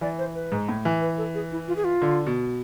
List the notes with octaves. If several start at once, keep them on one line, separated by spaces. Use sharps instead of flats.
E3 D5
C5
B4
G#2
A2
E3
B4
A4
G#4
E4
F4
G#4
F4
D3
B2